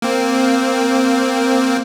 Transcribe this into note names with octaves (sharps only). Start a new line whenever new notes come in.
A#3 C4